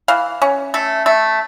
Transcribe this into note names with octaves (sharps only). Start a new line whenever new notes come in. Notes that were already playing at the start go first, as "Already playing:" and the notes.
E3 F5
C#4
A3
A3